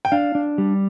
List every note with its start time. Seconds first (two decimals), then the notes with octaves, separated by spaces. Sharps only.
0.05 G5
0.12 D4 F5
0.35 D4
0.58 G3